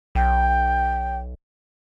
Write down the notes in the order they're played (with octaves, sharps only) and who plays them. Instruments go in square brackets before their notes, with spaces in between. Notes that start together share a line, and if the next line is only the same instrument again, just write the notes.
[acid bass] B1 [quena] G5